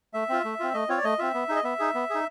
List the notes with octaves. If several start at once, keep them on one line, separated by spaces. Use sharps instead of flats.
A3 E5
C4 F4
A3
C4 F4
A3 D#5
C4 F4 C#5
D5
A3 D#5
C4 F4 E5
B3
D#4 G#4
D#5
B3 E5
D#4 G#4
B3
D#4 G#4